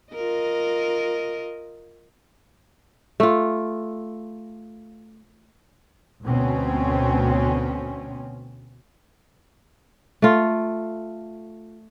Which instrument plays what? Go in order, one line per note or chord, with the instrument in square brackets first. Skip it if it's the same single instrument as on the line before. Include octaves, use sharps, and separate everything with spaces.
[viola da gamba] F4 A#4 D#5
[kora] A3 F4
[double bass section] D2 B2 C4 C#4
[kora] A3 F4